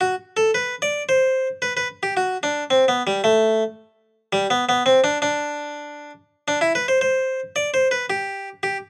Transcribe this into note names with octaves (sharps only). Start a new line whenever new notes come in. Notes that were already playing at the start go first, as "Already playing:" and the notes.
F#4
A4
B4
D5
C5
B4
B4
G4
F#4
D4
C4
B3
G3
A3
G3
B3
B3
C4
D4
D4
D4
E4
B4
C5
C5
D5
C5
B4
G4
G4